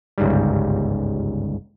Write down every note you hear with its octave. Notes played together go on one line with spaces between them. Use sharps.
G1 C#2 G#2 G3